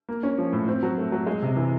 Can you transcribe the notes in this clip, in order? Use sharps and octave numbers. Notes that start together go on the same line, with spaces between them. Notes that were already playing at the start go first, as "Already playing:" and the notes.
A#3
C#4
F3
A2
C4
F#3
A3
F#3
G#3
C3
E3